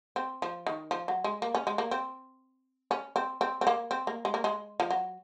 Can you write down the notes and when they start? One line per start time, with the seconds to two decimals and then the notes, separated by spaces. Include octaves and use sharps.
0.16 C4
0.42 F3
0.67 D#3
0.91 F3
1.08 F#3
1.24 G#3
1.42 A#3
1.55 C#4
1.67 G#3
1.78 A#3
1.91 C4
2.91 C#4
3.16 C4
3.41 C4
3.61 C4
3.67 A#3
3.91 C4
4.07 A#3
4.25 G#3
4.34 A#3
4.44 G#3
4.80 F3
4.91 F#3